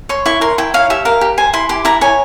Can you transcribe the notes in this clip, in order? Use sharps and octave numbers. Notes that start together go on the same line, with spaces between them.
C#5 C6
E4 C#6
A#4 C6
E4 G5
C#5 F5
G4 E5
A#4 F5
G4
C5 G#5
E4 C6
G4 C6
E4 A#5
C#5 G#5